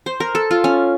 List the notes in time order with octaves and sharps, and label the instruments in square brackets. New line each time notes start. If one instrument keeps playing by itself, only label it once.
[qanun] C5
A#4
A4
F4
C#4